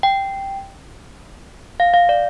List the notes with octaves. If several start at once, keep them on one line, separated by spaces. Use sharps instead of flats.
G5
F5
F5
D5